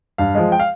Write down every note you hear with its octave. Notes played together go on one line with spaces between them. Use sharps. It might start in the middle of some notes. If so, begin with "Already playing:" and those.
G2 F5
F3 G#3
G5
F5